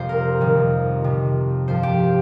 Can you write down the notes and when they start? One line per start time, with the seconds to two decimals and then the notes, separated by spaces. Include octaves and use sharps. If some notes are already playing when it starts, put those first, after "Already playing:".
Already playing: F2 C3 G3 C5
0.09 A#4
0.41 F2 C3 D#3 G3
1.04 F2 C3 F3
1.68 G2 F3 C5
1.83 G4